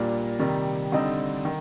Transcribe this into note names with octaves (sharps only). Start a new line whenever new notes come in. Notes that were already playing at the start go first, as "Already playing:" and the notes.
Already playing: A#2 G3 A#3 D4
C3 D#3 G3
D3 G3 C4 D#4
D#3